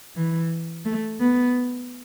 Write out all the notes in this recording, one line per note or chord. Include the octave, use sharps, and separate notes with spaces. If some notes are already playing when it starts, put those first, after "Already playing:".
E3
A3
B3